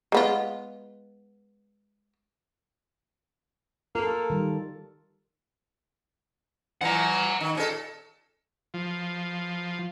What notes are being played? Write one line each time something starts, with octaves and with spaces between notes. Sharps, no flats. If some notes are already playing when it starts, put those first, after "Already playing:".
G#3 B3 F4
A#3 F4 A4
D#3 G3
A#2 E3 F#5 A#5
D#3
A#2 C#4 A4
F3